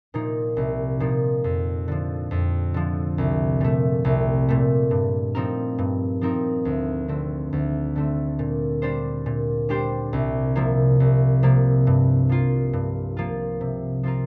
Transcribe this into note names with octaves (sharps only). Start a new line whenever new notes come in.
A#2 F3 A#3 D#4
C2
A#2 F3 A#3 D#4
F2
D3 F3
F2
D3 F3
C2
A#2 A3
C2
A#2 A3
G2
F3 C4 D#4 A#4
G2
F3 C4 D#4 A#4
D2
D3 A3 C4
D2
D3 A3 C4
A#2
G3 D4 G4 C5
A#2
G3 D4 G4 C5
C2
C3 F3 A#3
C2
C3 F3 A#3
G2
F3 A#3 F4
G2
F3 A#3 F4
C3
F3 C4 F4 A#4